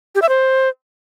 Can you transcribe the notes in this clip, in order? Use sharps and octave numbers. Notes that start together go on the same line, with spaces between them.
G4
E5
C5